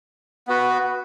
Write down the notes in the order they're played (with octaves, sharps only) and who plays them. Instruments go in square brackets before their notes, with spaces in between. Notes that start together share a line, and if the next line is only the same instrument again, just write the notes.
[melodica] B3 F#4 B4